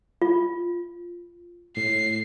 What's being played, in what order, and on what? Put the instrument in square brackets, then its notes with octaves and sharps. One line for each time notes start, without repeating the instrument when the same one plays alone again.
[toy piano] F4
[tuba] A2 [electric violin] C7